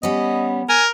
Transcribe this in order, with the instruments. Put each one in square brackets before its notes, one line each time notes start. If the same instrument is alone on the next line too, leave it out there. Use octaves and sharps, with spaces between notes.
[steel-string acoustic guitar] G3 C#4 [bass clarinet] B3 [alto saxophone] D#5
[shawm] A#4 [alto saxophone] G#5